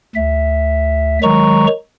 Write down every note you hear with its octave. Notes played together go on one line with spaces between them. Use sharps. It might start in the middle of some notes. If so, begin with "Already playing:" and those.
D2 E5
D#3 F#3 G#3 A#5 C#6